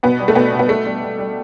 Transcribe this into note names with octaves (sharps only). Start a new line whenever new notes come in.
B2 B3
G3
A3
B2 B3
B2
B3
B2 A3
G3
G3
G3